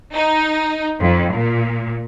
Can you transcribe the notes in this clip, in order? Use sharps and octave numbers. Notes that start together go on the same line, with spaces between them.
D#4
F2
A#2